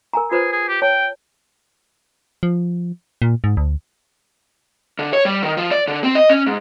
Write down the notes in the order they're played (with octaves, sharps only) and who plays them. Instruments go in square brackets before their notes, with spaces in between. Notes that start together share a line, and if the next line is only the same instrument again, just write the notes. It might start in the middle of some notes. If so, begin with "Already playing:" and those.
[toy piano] A#4 G#5 A#5
[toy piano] F4 B4 C5 [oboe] G#4
[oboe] G#4
G4
[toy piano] C#5 A5 [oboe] G5
[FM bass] F3
A#2
G#2
D2
[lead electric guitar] D3
C#5
G3
D#3
F3
D5
D3
C4
D#5
C#4
G#2